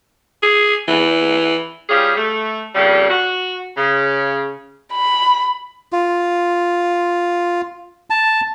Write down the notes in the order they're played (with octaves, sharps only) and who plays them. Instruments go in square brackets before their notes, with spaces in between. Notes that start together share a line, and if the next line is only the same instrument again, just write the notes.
[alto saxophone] G#4
E3
[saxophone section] G3 C#4 F4 G4 G#4
A3
F2 A#2 C#3 G3
F#4
C#3
[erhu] B5
[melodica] F4
A5